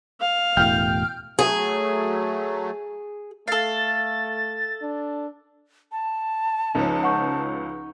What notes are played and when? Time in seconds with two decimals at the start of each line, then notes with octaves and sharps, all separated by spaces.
0.21 F5
0.57 E1 A2 G5 F6 G6
1.39 F#3 A3 G#4
3.48 A3 A4 F5 A6
4.82 D4
5.92 A5
6.75 C#2 F3 C#4 D#4
7.03 F#5 C#6 G6